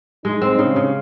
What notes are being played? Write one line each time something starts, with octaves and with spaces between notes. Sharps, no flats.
G#3 D#4
C4
C#3 C#4
C#3